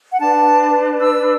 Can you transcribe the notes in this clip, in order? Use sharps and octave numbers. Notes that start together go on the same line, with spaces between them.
F#5
D4 B4 A5
E6